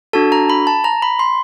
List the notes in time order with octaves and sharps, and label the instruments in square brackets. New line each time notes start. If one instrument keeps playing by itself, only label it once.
[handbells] D4 F#4 A4 A5
A#5
B5
A5
A#5
B5
C6